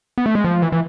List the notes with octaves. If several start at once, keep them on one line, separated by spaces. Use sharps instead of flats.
B3
A3
G#3
F3
E3
E3